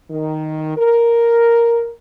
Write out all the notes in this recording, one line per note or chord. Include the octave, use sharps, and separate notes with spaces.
D#3
A#4